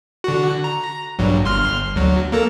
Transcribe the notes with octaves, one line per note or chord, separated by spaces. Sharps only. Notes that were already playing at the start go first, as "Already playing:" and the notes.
D3 F#4
A#5
A#1 G2 F#3
G1 C6 F6
D2 F#3
A#3 A4 A#4